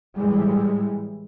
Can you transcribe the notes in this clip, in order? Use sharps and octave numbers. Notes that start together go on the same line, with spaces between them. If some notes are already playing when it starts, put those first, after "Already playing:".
A2 E3 G3 G#3